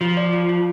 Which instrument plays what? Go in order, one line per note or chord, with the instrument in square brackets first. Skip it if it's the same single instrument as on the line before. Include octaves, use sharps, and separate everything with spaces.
[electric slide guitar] F3 [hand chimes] F4
[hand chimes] D5
F4
F4